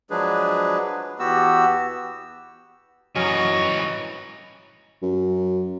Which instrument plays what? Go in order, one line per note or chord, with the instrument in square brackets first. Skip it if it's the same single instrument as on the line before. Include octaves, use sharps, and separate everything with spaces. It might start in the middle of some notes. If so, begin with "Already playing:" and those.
[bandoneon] F3 F#3 G#3 D4 G#4 B4
E2 B3 F#4 G4 E6
[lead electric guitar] F#2 E3 [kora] F#3 C#4 A#4 [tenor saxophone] C#5 [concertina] D#5
[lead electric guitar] G#2 E3
[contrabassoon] F#2